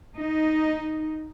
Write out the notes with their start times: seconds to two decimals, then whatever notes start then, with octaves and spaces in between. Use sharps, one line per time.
0.16 D#4